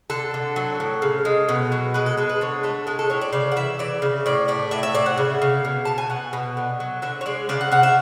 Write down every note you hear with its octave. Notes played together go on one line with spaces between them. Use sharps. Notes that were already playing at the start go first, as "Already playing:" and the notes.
D3 A4
D3
F#3
A2
C#3
G#3
B2
F#3
G#3 B4
A4
G#3 A4
B4
D3 C#5
A3 A4
G#3 G#4
A4
A2 C#5
D5
C#3 D5
F#5
E3 E5
E3 D5
C#3
A2 D5
A3 D5
A2 E5
E5
A2 D5
F#5
C#3
C#3
B2
B2 A5
G#5
B2 F#5
B2
D3
F#3
D3 E5
C#5
G#3 D5
C#3 D5
F#5
C#3 F#5
E5